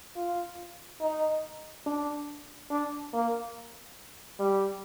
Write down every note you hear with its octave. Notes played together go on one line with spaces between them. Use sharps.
F4
D#4
D4
D4
A#3
G3